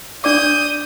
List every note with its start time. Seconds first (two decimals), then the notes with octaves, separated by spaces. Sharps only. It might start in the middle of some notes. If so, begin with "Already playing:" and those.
0.24 D4 D5 D6 D#6 G6